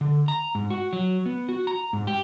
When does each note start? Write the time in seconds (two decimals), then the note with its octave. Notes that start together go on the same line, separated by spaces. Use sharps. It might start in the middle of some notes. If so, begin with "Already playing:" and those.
0.01 D3
0.28 A#5
0.55 G#2
0.70 F#4
0.93 F#3
1.26 B3
1.49 F#4
1.67 A#5
1.93 G#2
2.07 G4